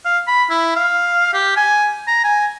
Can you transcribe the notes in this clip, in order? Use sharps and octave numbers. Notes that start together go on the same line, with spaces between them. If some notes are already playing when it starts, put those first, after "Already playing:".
F5
B5
E4
F5
G4
G#5
A#5
G#5